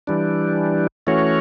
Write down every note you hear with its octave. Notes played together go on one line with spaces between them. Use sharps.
E3 G3 D4
E3 A3 C#4 F#4 C#5